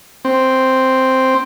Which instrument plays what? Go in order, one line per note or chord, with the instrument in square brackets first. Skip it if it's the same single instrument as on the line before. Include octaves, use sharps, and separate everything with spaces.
[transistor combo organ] C4